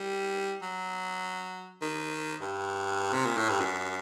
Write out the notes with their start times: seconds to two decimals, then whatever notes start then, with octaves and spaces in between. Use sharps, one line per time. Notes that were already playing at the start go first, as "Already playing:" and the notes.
Already playing: G3
0.62 F#3
1.82 D#3
2.41 G2
3.14 C3
3.25 A#2
3.37 A2
3.49 G2
3.61 F#2